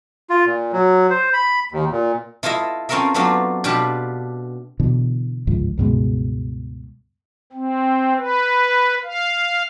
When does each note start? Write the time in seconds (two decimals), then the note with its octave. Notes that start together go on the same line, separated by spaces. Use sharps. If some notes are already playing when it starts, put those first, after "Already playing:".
0.30 F4
0.46 A#2
0.73 F#3
1.10 C5
1.33 B5
1.72 D#2
1.92 A#2
2.43 E4 F4 A4 D#5 E5
2.89 C4 C#4 F4 A4 A#4 E5
3.14 F#3 A3 B3 C4 D4 F4
3.64 B2 D4 F4 G4 B4
4.80 B2 D3 E3
5.47 G1 C#2 G#2 F3
5.78 C#2 G2 B2 G#3
7.53 C4
8.17 B4
9.04 F5